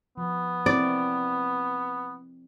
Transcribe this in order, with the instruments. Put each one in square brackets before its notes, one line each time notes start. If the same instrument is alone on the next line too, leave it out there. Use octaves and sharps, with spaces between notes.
[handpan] F3 [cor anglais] B3
[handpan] C4 E4 A#4 [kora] D5